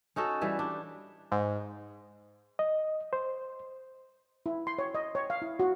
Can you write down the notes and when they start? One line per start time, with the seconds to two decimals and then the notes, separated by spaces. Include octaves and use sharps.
0.16 C#4 D#4 F#4 A4
0.41 E3 G3 B4
0.59 D4
1.32 G#2
2.59 D#5
3.13 C5
4.46 E4
4.67 C6
4.79 C#5
4.95 D#5
5.15 C#5
5.30 F5
5.42 E4
5.60 F#4